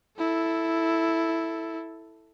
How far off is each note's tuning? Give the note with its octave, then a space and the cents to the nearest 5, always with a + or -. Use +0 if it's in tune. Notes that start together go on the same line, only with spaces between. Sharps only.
E4 -5 A4 +5